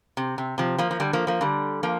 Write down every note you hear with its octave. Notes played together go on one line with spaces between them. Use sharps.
C3
C3
C3 F3
F3 A#3
F3
D3 G3
F3 A#3
F3 A#3
D3 G3
F3 A#3